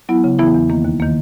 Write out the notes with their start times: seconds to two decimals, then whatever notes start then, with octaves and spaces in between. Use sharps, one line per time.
0.09 F#3 B3 E4
0.24 C#3
0.39 E3 B3 E4
0.54 E2
0.70 D#3 A#3
0.85 D#2
1.00 D#3 A#3